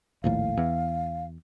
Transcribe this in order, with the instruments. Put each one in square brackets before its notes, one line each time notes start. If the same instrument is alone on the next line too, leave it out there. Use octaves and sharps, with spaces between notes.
[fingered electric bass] A#1 D#2 A2 [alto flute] F5
[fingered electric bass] E2